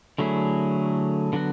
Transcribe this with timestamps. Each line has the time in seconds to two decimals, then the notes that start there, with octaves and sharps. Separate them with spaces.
0.18 D3 F#3 A3 E4 G#4
1.33 D3 F#3 B3 F#4